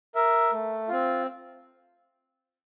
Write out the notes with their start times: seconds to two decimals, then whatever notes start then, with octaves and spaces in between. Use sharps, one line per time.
0.15 A#4 E5
0.52 A3
0.89 C4 F4